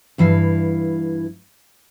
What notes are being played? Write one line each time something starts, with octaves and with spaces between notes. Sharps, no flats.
G2 E3 E4 F5